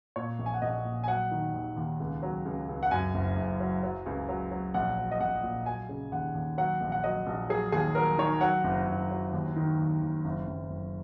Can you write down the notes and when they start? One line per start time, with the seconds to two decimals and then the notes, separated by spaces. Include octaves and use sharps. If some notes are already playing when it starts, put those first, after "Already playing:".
0.16 A#2 C#5
0.39 A#1
0.46 G#5
0.54 F#5
0.62 A#1 D#5
0.85 A#2
1.04 G#5
1.08 F#3 F#5
1.31 D#3
1.54 D#2
1.77 D#2
2.00 C#2
2.23 F#3
2.46 C#2
2.69 C#2
2.83 F#5
2.91 F#2 G#5
3.15 F#1
3.37 F#1
3.60 F#3
3.83 F#3
4.06 C#2
4.29 F#3
4.51 F#3
4.74 A#1 F#5
4.97 F#3
5.12 D#5
5.21 A#1 F#5
5.43 A#2
5.66 F#3 G#5
5.89 C#3
6.12 D#2 F#5
6.35 D#2
6.58 F#3 F#5
6.81 A#1
6.92 F#5
7.04 F#3 D#5
7.27 A#1
7.50 F#3 G#4
7.72 D#2 G#4
7.95 F#3 A#4
8.18 D#3 C#5
8.41 F#3 F#5
8.64 F#1
8.87 F#1
9.11 F#3
9.33 D#2
9.56 D#3
9.79 D#2
10.02 D#2
10.25 F#1
10.48 F#1
10.70 F#1